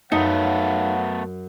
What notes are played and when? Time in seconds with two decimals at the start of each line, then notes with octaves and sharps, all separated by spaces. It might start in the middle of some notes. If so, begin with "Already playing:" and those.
0.12 F#2 A3 B3 D#4 C#5 F5 F#5